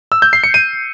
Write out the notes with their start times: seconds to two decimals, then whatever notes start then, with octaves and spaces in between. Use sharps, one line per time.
0.12 E6
0.22 G6
0.33 C7
0.44 C#7
0.54 D#7